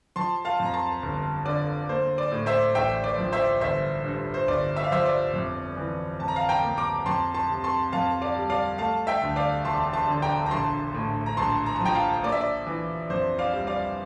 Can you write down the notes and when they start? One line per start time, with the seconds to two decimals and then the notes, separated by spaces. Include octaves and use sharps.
0.16 F3 A5 C6
0.45 F5 A5
0.60 F2
0.65 A#5
0.74 A5 C6
1.02 G1
1.45 D3 D5
1.89 A#3 C5
2.18 D5
2.31 A2
2.46 C5 E5
2.75 A1 E5 G5
3.04 D5
3.18 F3
3.32 C5 E5
3.61 G1 C5 E5
4.04 G2
4.34 C5
4.47 G1 D5
4.77 E5
4.84 F5
4.91 F3 C5 E5
5.06 D5
5.33 F2
5.77 E3
6.20 F2 A5
6.28 A#5
6.36 F5 A5
6.49 G5 A#5
6.64 A#3
6.77 A#5 D6
7.06 F2 A5 C6
7.34 A5 C6
7.49 C3
7.64 A5 C6
7.92 F2 F5 A5
8.21 D5 F5
8.36 G3
8.50 D5 F5
8.78 A3 F5 A5
9.07 E5 G5
9.21 D2
9.36 D5 F5
9.65 E1 A5 C6
9.93 A5 C6
10.08 D3
10.22 G5 A#5
10.46 A#5
10.51 A#1 A5 C6
10.94 A2
11.26 A#5
11.37 A#1 A5 C6
11.66 A#5
11.76 A5
11.81 F3 G5 A#5
11.95 F5 A5
12.23 A#3 D5
12.32 E5
12.41 D5
12.67 E3
13.10 F2 C5
13.39 D5 F5
13.53 G3
13.67 D5 F5